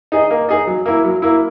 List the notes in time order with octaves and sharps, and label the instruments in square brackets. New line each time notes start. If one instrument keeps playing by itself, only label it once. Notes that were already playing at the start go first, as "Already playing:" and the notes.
[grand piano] D#4 G#4 D#5
A#3
D#4 G#4 D#5
F#3
A#3 E4
F#3
A#3 E4